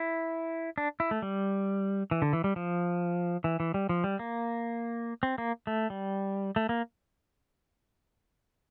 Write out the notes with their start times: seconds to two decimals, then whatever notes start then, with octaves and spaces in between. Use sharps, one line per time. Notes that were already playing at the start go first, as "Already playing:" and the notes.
Already playing: E4
0.78 D4
1.00 E4
1.11 A3
1.22 G3
2.11 E3
2.22 D3
2.33 E3
2.44 G3
2.56 F3
3.44 E3
3.60 E3
3.74 G3
3.89 F3
4.04 G3
4.19 A#3
5.23 C4
5.38 A#3
5.67 A3
5.90 G3
6.56 A3
6.69 A#3